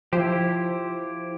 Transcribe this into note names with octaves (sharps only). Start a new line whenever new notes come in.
F3 E4 G4 C5